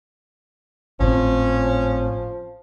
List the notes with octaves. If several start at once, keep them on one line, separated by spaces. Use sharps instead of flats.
G#1 A2 F3 C4 C#4